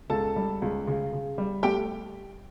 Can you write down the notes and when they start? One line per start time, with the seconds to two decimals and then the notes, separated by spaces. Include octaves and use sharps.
0.10 C#2 A4 A5
0.36 G3
0.62 C#2
0.87 C#3
1.13 C#3
1.38 G3
1.63 A3 G4 G5